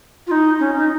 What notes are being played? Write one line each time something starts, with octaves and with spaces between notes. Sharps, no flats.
F4
D#4
C#4
D#4